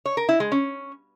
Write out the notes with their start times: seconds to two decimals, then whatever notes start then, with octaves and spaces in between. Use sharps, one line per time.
0.05 C#5
0.17 A#4
0.29 E4
0.40 G#3
0.52 C#4